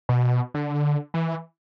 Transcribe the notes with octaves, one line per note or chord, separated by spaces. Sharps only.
B2
D3
E3